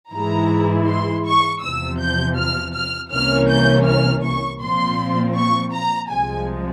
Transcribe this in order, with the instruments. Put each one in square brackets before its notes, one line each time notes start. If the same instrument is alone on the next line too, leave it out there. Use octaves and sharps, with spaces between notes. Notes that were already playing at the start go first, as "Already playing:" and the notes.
[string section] G#2 E3 G#3 E4 A#5
C6
C#6
E2 C3 F3 E6
G6
F6
F6
C2 C3 E3 A#3 C#4 F6
G6
F6
C#6
A#2 F3 C4 C6
C#6
A#5
C2 C3 F3 G#3 G#5